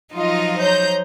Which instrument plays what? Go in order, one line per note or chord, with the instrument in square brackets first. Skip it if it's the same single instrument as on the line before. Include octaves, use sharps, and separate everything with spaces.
[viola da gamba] F3 F#3 D#4 [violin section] F4 D#5
[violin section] C5 A#5 G6 [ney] C#5